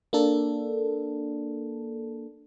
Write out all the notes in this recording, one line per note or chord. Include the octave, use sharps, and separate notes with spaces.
A#3 D4 A4